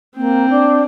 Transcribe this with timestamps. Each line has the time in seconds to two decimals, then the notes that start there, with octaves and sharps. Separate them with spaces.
0.17 A#3 C4
0.49 D4